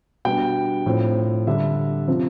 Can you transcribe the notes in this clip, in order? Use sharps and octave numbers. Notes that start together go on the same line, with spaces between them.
B2 G3 B3 D4 G5
A2 F3 C4
D3 G3 D4 E5
C3 F3 C4